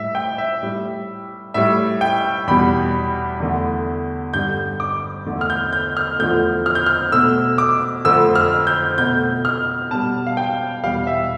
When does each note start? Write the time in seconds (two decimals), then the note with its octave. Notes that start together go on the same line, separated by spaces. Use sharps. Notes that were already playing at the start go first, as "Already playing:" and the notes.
Already playing: A2 G3 E5
0.15 G5
0.38 E5
0.62 A2 G3
1.54 A2 G3 E5
2.01 G5
2.47 E2 B2 G3 B5
3.40 E2 D3 A3
4.33 G2 D3 G3 G6
4.80 D6
5.26 E2 D3 A3
5.41 F6
5.50 G6
5.73 G6
5.97 F6
6.19 E2 D3 F3 A3 G6
6.66 F6
6.75 G6
6.86 F6
7.12 B2 A3 E6
7.58 D6
8.05 F2 D3 F3 A3 E6
8.35 F6
8.67 G6
8.98 B2 A3 G6
9.45 F6
9.91 B2 G3 A5
10.27 F5
10.37 G5
10.84 E2 B2 G3 F5
11.07 E5